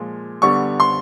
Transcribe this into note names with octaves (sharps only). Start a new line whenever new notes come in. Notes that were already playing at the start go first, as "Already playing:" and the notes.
Already playing: A#2 F3 G#3
D3 G3 B3 C#6
C6